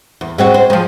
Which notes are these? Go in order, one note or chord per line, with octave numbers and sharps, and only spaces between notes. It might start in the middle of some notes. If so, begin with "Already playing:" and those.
E2
G#3 C4 F#4
C5
F3 G#3